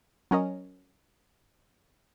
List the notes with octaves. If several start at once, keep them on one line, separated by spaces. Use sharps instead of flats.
F#3 C#4 A#4 D#5